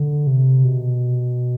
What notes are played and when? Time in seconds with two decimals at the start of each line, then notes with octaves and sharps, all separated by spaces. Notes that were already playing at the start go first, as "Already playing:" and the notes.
Already playing: D3
0.27 C3
0.65 B2